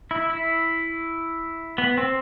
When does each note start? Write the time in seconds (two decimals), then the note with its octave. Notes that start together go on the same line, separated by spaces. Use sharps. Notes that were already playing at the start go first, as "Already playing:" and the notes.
0.11 E4
0.30 E4
1.78 B3
1.98 C4